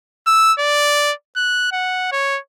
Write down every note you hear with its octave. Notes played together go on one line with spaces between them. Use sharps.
E6
D5
F#6
F#5
C#5